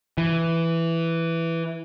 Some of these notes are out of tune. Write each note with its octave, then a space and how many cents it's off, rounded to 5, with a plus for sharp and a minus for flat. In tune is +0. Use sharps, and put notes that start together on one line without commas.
E3 +5